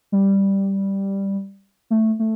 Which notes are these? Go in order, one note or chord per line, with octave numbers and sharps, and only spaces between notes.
G3
A3
A3